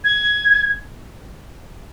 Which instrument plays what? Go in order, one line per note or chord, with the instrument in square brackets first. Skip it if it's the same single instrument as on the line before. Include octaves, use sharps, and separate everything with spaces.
[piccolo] G#6